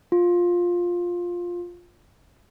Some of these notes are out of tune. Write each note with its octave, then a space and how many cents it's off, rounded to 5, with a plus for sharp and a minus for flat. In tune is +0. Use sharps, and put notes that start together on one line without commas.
F4 +10